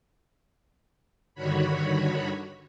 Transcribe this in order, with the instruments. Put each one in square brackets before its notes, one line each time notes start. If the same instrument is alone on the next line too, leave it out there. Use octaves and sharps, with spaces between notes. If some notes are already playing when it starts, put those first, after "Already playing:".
[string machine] G2 D3 D#3 F#4 C#5 B5